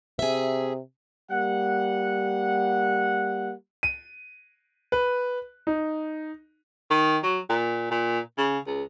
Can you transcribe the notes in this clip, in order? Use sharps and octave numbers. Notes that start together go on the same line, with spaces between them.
C3 G#4 E5
G3 A#3 F#5
D#7
B4
D#4
D#3
F#3
A#2
A#2
C#3
C#2